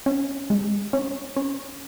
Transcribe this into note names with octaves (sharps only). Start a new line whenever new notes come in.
C#4
G#3
C#4
C#4